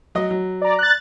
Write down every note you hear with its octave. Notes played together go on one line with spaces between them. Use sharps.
F#3 D#5
F#3
D5 A#5
F#6 A6